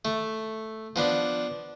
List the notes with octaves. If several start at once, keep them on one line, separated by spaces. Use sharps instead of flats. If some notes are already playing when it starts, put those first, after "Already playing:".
A3
F3 B3 D4